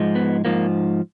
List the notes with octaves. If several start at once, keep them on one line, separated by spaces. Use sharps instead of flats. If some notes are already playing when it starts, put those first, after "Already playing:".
Already playing: G#2 F3 G#3
B3
G#2 F3 A#3